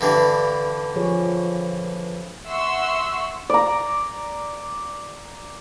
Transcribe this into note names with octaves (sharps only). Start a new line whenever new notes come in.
G2 D3 E3
F3 G#4 C#5
E5 F#5 C6 C#6 E6
D5 A#5